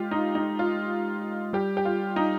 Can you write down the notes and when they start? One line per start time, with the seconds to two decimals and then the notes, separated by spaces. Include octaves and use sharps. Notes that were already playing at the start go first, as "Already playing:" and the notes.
Already playing: G#3 F4 G4
0.11 D#4
0.35 D#4
0.59 F4
1.53 G3 G4
1.77 G4
1.85 F4
2.16 D#4